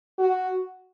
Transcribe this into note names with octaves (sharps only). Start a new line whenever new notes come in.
F#4